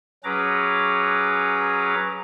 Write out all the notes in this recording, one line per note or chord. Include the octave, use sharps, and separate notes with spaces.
F#3 C#4 G#4 B4 A#5 D6